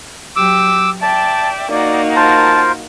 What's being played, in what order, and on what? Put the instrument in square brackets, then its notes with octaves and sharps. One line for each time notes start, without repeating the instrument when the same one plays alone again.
[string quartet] F#3 G4 [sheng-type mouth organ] D6 E6
[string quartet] D5 E5 G5 [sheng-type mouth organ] A5
[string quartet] A#3 D#4 F#4 [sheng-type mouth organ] D5
[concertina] F4 A#4 C5 [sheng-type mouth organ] A5